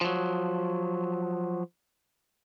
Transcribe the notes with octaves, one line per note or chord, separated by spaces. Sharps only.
F3 F#3